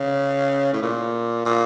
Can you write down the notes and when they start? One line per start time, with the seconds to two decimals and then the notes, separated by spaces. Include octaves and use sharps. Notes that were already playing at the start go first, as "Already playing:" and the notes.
Already playing: C#3
0.73 A2
0.82 A#2
1.46 A#2